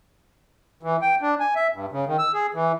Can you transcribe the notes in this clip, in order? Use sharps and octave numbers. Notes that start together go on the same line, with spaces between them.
E3
G5
D4
G#5
E5
G2
C#3
D#3
E6
G#4
E3